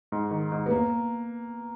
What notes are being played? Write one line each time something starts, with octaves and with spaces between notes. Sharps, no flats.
G#2
D#3
G#2
B3
A#3